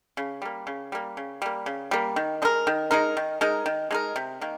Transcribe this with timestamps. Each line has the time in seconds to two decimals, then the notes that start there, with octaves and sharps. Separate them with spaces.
0.17 C#3
0.42 G3 A#3
0.67 C#3
0.92 G3 A#3
1.17 C#3
1.42 G3 A#3
1.66 C#3
1.91 G3 A#3
2.16 D#3
2.42 G#3 D#4 A#4
2.67 D#3
2.91 G#3 D#4 A#4
3.17 D#3
3.41 G#3 D#4 A#4
3.66 D#3
3.91 G#3 D#4 A#4
4.16 C3
4.41 D#3 A#3